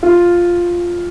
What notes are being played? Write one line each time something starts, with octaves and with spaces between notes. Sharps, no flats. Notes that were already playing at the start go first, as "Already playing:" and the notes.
F4